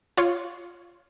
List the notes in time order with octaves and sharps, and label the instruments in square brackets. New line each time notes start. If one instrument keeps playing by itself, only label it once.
[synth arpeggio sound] F4 C#5